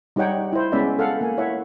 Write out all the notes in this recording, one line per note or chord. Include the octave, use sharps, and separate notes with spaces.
G3 D#4 G4 C#5 F#5 G5
E4 C5
G#3 B3 C#4 B4 D5 E5
A4 F5 F#5
A#3 G#5
E4 C#5 E5 F#5